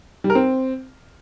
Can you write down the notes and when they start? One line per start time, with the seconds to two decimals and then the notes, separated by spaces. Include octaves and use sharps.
0.24 G3
0.30 A#4
0.35 C4